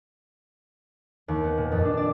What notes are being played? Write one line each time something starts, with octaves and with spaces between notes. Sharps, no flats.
D#2
B3
A#2
F2
D4
D5